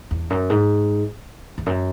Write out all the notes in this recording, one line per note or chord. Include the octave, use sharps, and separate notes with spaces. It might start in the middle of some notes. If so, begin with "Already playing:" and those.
E2
F#2
G#2
E2
F#2